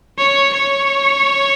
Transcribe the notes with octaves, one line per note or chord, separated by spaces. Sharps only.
C#5
C#5